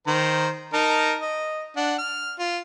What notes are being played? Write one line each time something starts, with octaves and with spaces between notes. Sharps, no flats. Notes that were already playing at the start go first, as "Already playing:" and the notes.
D#3 C5 A#5
D#4 A#4 A5
D#5
D4 F#5
F6
F4